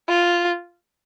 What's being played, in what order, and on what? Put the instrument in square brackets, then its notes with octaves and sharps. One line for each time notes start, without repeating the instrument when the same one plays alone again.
[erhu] F4